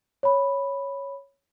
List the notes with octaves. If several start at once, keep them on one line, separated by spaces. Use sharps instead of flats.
C#5 B5